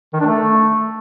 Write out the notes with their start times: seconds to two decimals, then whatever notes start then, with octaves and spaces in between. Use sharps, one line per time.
0.14 D#3
0.20 D4
0.27 A3